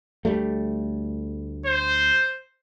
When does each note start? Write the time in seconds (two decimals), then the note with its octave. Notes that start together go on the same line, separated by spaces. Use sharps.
0.25 D2 G3 A3
1.66 C5